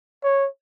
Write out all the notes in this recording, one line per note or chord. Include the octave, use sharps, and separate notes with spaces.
C#5